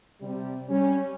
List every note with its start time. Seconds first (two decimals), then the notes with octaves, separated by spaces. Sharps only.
0.21 C3 G3
0.69 G3 C#4